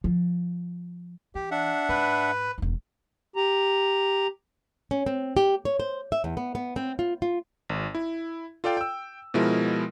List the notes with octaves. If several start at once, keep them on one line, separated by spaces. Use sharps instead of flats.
F3
E3 G4
D4 E5 F#5
G#2 B4
E1 D#4
G4 A#5
C#4
C4
G4
C#5
C5
E5
E2
B3
B3
C4
F4
F4
G#1
E4
F4 A4 D5 F5 G5
G5 E6
B2 F3 G#3 E4 A#4